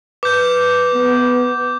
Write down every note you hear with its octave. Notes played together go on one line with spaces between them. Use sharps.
B4 D6 G6
B3